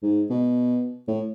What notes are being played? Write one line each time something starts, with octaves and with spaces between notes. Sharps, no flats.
G#2
B2
A2